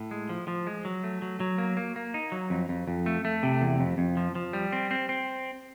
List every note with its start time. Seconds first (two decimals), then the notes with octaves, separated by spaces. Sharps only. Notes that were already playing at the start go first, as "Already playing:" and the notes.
Already playing: A2
0.11 G#3
0.29 F3
0.48 F3
0.67 G#3
0.85 F#3
1.04 A3
1.22 F#3
1.40 F#3
1.58 A#3
1.77 A#3
1.96 A#3
2.14 D#4
2.32 F#3
2.50 F2
2.69 F2
2.88 F2
3.06 A3
3.25 A3
3.43 C3
3.62 E2
3.80 F2
3.98 F2
4.17 F3
4.35 F3
4.53 G3
4.73 C4
4.91 C4
5.09 C4